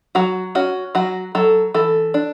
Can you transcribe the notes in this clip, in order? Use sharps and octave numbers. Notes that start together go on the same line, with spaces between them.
F#3 F#4
C#4 F#4
F#3 F#4
F#3 A4
E3 A4
D4